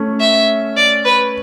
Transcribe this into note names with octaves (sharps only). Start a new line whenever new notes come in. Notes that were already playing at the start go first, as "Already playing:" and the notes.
Already playing: A3 C#4
E5
D5
B4